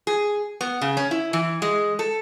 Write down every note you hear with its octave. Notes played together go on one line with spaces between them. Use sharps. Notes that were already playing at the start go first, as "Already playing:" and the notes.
G#4
B3
C#3
C#4
E4
E3
G#3
A4